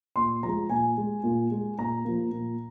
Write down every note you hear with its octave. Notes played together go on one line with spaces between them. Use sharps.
A#2 C6
F3 G#3 A#5
A#2 G#5
G#3
A#2
G#3
A#2 A#5
F3 A#3
A#2